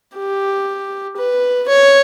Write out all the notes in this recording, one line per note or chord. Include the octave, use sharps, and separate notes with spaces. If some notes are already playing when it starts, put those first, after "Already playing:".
G4
B4
C#5